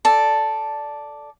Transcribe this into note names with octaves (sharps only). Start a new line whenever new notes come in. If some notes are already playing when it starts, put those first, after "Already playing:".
A4 D5